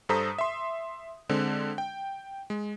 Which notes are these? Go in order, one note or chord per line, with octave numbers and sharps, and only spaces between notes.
G2 A4 C5 A#5 D#6 B6
E5 C6
D3 G#3 C4
G5
G#3